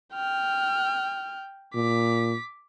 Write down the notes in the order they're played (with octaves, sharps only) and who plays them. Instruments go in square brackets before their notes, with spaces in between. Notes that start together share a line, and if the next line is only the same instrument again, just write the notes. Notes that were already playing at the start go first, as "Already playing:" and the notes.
[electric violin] G5 F6
[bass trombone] A#2 [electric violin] D6 B6